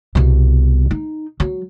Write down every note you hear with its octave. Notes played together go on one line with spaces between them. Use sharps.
C2 B2
D#4
F#3